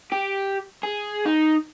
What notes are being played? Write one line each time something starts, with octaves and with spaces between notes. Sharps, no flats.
G4
G#4
D#4